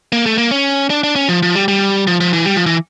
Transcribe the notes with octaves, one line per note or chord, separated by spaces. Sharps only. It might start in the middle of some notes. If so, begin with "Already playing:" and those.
A#3
A3
A#3
C#4
D4
D4
C#4
F3
F3
G3
G3
F3
F3
E3
G3
F3
E3